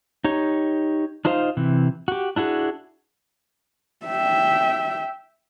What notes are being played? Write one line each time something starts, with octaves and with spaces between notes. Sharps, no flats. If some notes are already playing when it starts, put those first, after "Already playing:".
D#4 G4 C#5
D4 D#4 F4 C5 D#5 F5
C3 E3
F#4 G4
D4 E4 F#4 G#4
E5 G5